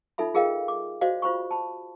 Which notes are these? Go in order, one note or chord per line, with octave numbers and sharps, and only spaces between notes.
D#4 F4 A4 E5 B5
F4 G#4 A#4 D#5 F5 G5
D6
F#4 C5 D5 D#5 F5
F4 C5 B5 C#6
A5 B5